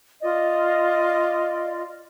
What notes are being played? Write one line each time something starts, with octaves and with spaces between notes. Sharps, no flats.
F4 D5 D#5